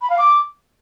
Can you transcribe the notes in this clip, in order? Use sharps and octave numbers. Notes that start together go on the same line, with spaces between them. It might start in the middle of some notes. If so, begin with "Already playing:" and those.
B5
F5
D6